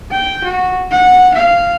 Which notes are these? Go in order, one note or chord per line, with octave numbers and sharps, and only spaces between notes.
G5
F#4
F#5
F5